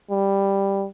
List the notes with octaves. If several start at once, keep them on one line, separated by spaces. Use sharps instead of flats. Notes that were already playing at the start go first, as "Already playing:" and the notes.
G3